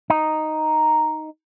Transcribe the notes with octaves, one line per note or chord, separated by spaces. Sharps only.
D#4